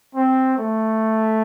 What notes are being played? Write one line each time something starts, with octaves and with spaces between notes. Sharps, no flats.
C4
A3